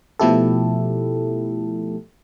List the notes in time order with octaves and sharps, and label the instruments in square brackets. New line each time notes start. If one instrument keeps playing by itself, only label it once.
[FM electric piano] B2 F3 A3 E4 G4 A4